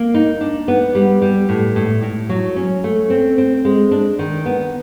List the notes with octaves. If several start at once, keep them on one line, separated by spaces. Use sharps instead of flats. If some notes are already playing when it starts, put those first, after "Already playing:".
Already playing: A#3
D#4
D4
B3
G3
G3
A2
A2
A2
F#3
C#4
A3
C4
C4
G#3
D4
D#3
B3